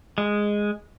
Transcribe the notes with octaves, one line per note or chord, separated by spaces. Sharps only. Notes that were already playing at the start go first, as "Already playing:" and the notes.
G#3